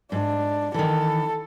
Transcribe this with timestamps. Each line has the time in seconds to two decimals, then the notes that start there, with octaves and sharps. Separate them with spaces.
0.12 G#2 D4
0.74 D#3 E3 A4